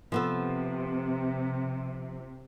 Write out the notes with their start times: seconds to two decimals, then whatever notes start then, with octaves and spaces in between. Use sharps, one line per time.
0.12 C3 F3 B3 A4